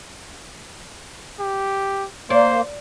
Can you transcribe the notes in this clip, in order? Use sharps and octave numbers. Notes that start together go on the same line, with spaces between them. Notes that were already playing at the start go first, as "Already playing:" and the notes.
G4
A#3 C5 D5